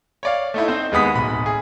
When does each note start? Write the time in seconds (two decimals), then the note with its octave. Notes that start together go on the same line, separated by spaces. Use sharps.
0.23 C#5 D5 F5
0.54 A3 D#4 E4
0.68 C4 D#4 C5
0.92 D#2 G#3 B3 D#6 B6
1.15 D1 B1 B5
1.46 G#4